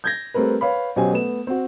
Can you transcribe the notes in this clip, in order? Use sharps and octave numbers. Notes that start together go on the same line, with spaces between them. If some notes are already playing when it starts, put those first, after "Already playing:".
G6 G#6 A#6
G3 A3 C4 A#4 B4
B4 C#5 F5 B5
B2 F#3 C#4 G4 C5 G#5
A3 B3 E7
C4 F#4